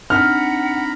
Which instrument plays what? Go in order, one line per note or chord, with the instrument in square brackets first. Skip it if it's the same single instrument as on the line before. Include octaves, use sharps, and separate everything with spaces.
[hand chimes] C4 D4 D#4 [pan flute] F#5 [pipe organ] A#5 B5 [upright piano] F6